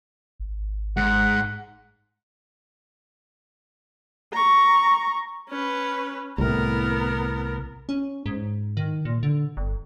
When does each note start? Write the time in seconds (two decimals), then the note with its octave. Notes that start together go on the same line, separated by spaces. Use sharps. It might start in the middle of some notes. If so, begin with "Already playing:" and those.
0.40 G#1
0.97 G#2 F#5
4.32 A#5 C#6
5.50 C#4 B4
6.38 C2 A2 B3 A#4
7.89 C#4
8.26 G#2
8.77 D#3
9.05 A#2
9.23 D3
9.57 G1